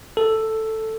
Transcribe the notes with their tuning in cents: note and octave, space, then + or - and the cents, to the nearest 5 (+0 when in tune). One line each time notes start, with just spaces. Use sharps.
A4 +5